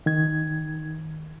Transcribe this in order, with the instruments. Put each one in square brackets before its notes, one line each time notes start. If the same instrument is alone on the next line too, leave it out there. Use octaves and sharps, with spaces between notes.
[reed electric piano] D#3 G#6